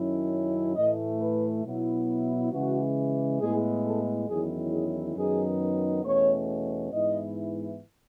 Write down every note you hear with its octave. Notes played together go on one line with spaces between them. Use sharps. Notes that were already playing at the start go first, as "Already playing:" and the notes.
Already playing: F#2 D#3 F#3 C#4 E4
A2 E3 A3 D#5
B4
B2 F#3 B3 E4
C#3 E3 G#3 F#4
A2 G#3 B3 E4 G#4
A4
E2 D#3 F#3 C#4 E4 G#4
G#4
F#2 D#3 F#3 B3 D#4 G#4
E2 B2 A3 C#4 C#5
G#2 E3 B3 E4 D#5